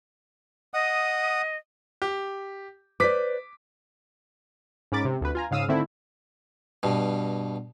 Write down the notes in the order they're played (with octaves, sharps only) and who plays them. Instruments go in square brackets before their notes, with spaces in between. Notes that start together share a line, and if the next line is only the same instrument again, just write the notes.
[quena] D#5 [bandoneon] F#5 D#6
[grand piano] G4
[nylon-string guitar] B4 C5 D5 [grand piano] D6 B6
[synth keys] G#2 C#4 A#4 B5 D6 A6
C3
D2 B4
F4 G#5 A#5
G#2 C#3 F5 D#6 E6 D#7
D3 D#3 A3 C4 E4
[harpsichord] G2 B2